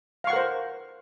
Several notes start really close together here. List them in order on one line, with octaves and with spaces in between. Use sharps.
F5 C#6 F#5 A#4 C5